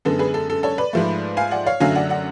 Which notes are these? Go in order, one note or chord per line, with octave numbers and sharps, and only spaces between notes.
F#2 D3 G#3 B3 A4
G#4 B4
A4
A4
A4 C#5
B4 D5
G#2 F3 A3
F5 G#5
D5 F#5
C#5 F5
F#2 D3 F#3 A3 F5 G#5
D5 F#5
D5 F#5